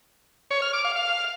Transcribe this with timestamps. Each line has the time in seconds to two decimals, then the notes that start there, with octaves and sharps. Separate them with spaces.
0.51 C#5
0.62 F6
0.73 D6
0.85 F5
0.96 F5